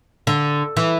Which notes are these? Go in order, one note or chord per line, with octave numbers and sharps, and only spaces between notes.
D3
E3